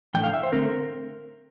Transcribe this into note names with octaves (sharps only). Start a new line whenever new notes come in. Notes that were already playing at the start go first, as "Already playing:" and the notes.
A2 E3 A3 D4 G5
F5
E5
C5
D3 A3 C4 A#4